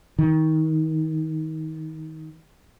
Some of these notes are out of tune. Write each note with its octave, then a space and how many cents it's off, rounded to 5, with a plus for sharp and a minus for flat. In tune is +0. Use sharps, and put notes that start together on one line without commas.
D#3 +25